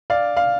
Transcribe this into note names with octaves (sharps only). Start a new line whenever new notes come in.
D4 D5 F5
F5